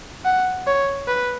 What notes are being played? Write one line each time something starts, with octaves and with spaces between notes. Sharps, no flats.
F#5
C#5
B4